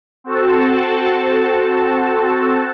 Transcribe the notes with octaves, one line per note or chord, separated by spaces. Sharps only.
C4 F#4 A4 A5